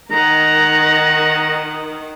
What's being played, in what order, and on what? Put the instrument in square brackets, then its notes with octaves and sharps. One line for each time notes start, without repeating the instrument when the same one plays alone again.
[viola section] D#3 [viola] A#4 F#5 [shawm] A#5